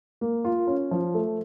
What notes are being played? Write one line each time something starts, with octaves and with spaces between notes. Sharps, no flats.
A#3
F4
C#4
F3
A3